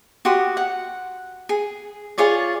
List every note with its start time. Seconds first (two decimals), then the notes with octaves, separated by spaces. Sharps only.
0.25 F#4 G4 C6 D#6
0.57 F#5
1.49 G#4
2.18 F4 G#4 C#5 D5